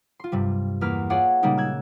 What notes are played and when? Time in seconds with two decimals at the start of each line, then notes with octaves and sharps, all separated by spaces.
0.20 F4 C6
0.32 G2 C3 G3
0.81 E2 A#3 B4 F6 B6
1.10 F4 G#4 C#5 D5 F5 F#5
1.43 A#2 C#3 G3 G#3 A#3 D#4
1.57 E6 F#6 G#6